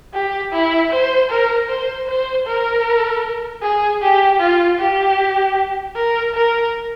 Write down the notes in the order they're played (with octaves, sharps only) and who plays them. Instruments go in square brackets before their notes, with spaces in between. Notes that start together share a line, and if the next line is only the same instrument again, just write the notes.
[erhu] G4
E4
C5
A#4
C5
C5
A#4
G#4
G4
F4
G4
A#4
A#4